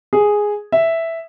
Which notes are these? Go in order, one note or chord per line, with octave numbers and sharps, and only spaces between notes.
G#4
E5